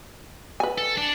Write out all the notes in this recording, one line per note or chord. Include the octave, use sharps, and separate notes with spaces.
B4 G#5
A4
D4 A5